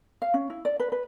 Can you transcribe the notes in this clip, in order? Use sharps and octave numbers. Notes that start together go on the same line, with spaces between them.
F5
C#4
E4
D5
B4
B4